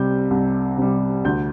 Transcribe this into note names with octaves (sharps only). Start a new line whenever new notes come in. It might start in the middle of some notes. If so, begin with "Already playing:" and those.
Already playing: C2 C3 G3 G6
C2
C3 G3
D2 G6